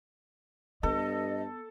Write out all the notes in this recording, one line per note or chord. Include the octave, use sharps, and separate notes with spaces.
G2 B3 A4 D#5